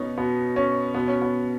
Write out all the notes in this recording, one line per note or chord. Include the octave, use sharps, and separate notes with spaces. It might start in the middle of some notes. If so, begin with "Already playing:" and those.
Already playing: B2 B3 C#4 D#4
B2 B3
C#4
B2 B3
C#4
B3